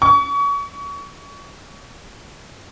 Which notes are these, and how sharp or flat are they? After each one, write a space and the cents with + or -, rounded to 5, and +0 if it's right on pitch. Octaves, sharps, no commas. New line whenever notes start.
C#6 +35